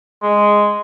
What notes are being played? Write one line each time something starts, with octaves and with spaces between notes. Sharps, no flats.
G#3